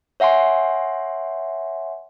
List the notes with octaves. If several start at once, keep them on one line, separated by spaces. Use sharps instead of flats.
C#5 E5 F#5 G#5 C6